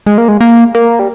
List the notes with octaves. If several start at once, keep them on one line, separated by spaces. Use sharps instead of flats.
G#3
A#3
G#3
A#3
A#3
G3